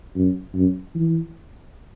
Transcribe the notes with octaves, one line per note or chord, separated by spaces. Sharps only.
F#2
F#2
E3